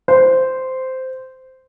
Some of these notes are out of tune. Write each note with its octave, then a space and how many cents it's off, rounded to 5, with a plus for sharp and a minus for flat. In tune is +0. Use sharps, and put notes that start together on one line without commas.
C5 -10